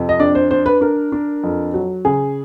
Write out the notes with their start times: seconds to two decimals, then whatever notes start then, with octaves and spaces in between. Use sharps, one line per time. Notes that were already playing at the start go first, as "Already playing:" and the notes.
Already playing: F2 C3
0.09 D#5
0.19 D4 D5
0.35 C5
0.51 D4 C5
0.66 B4
0.81 D4 A#4
1.12 D4
1.43 F2
1.74 F#3
2.05 C#3 G#4